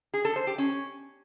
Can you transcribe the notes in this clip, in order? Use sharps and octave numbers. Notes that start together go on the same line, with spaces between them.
G#4
A4
C5
G4
C#4